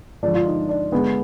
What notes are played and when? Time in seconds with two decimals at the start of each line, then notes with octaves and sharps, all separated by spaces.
0.23 D3 F3 G#3 D4
0.34 F4
0.45 D#4
0.69 D4
0.92 D3 G#3 B3